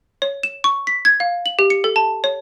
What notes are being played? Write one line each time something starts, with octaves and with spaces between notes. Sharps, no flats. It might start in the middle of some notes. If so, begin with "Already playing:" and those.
C#5
E7
C#6
B6
G#6
F5
F#7
G4
C#7
A4
A5
C#5